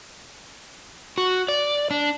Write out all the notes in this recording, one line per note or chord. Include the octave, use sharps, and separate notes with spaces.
F#4
D5
D4